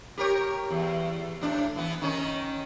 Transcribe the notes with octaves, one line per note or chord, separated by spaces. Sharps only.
G4 A#4 C#5
E2
A2 D4
E3 B3
D#3 C#4 D#4